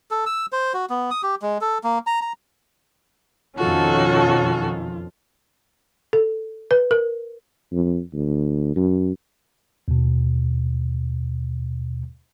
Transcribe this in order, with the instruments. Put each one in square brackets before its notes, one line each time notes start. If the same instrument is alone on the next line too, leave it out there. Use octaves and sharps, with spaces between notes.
[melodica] A4
E6
C5
F#4
B3
D#6
G4
G#3
A4
A#3
A#5
A#5
[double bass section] F2 B2 F3 [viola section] D#3 C#4 A4 [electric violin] F4 [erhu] F#4
[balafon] A4
B4
A#4
[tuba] F2
D2
F#2
[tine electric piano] D#2 B2